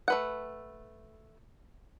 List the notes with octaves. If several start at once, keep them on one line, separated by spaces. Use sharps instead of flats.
A3 B4 F#5